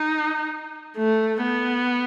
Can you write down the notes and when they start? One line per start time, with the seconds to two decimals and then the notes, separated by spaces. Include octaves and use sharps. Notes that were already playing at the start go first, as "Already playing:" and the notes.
Already playing: D#4
0.97 A3
1.42 B3